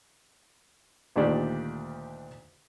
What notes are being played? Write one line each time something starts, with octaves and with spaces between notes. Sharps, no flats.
D2 A#2 D#3 D4 G4 D5